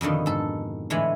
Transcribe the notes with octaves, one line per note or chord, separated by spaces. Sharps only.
F2 B2 D3 D#3
G#2 A4
A2 D3 E3 G#3 G#5 B5